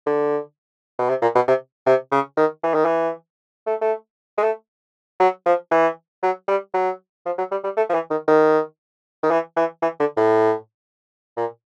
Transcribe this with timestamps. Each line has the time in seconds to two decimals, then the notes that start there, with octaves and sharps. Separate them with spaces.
0.06 D3
0.99 B2
1.09 C3
1.22 A#2
1.35 B2
1.48 C3
1.86 C3
2.12 C#3
2.37 D#3
2.63 E3
2.74 D#3
2.85 E3
3.67 A3
3.81 A3
4.38 G#3
4.43 A3
5.20 F#3
5.46 F3
5.71 E3
6.23 F#3
6.48 G3
6.74 F#3
7.26 F3
7.38 F#3
7.51 G3
7.64 G3
7.77 A3
7.89 F3
7.94 E3
8.10 D#3
8.28 D#3
9.23 D#3
9.31 E3
9.57 E3
9.82 E3
9.99 D3
10.16 A2
11.37 A#2